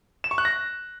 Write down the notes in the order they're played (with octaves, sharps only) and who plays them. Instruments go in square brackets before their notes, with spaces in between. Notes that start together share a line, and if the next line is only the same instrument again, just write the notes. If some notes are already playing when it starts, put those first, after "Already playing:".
[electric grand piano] E7
C#6
F#6
A#6